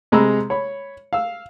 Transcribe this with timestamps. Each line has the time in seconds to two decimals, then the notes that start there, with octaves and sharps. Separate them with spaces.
0.12 C3 G#3 A#5 B5 E6
0.50 C#5 B5
1.13 F5 E6